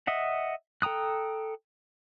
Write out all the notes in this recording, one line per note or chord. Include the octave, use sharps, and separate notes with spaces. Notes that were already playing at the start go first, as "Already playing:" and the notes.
D#5 E5 F#5
A4 G5 A#5 D#6 F#6